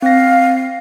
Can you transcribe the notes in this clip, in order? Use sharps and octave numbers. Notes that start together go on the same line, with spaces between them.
C4 F5 A#6